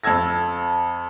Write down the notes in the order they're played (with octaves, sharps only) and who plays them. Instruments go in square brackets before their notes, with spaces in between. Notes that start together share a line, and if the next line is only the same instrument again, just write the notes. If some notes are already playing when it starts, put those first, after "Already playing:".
[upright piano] F2 A5 E6 G#6 A#6